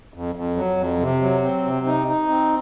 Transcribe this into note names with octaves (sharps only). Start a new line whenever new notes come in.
F2
F2
F#3
F2
C3
F#3
C4
C3
D#4
D#4
C4